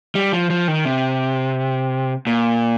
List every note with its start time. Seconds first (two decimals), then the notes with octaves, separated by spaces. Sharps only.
0.15 G3
0.33 F3
0.50 F3
0.68 D#3
0.85 C3
2.27 A#2